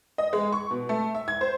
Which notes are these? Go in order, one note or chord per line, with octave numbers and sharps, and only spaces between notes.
D#5
G#3
C#6
B2
A3
E5
G#6
C5